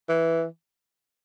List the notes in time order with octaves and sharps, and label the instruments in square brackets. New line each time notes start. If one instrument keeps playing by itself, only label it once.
[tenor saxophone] E3